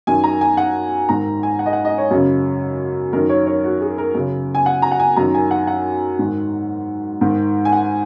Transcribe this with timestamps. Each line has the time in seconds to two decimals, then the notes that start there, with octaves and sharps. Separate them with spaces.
0.07 F#2 D#3 G#5
0.24 A#5
0.41 G#5
0.57 F#5
1.09 G#2 D#3 A#5
1.43 G#5
1.59 F#5
1.66 D#5
1.73 F#5
1.85 D#5
1.98 C#5
2.11 F#2 C#3
3.13 F#2 D#3 A#4
3.29 C#5
3.47 C#5
3.64 F#4
3.81 G#4
3.98 A#4
4.15 F#2 C#3
4.55 G#5
4.66 F#5
4.82 A#5
4.92 F#5
5.00 G#5
5.16 F#2 D#3 A#5
5.34 G#5
5.51 F#5
5.67 F#5
6.19 G#2 D#3
7.21 G#2 D#3
7.65 G#5
7.72 F#5